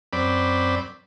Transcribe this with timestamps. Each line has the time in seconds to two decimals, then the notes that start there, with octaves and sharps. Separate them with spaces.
0.13 F#2 C4 D5 B5